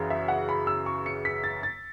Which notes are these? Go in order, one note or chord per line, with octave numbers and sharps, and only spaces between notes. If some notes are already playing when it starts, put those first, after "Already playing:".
Already playing: F#2 C#3 E3
E5
F#5
B5
E6
C#6
C#7
B6
A6
A6